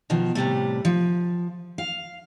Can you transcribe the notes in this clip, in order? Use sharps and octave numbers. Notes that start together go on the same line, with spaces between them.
B2 D#3 F3
A2 C3 G3 A3
F3
F5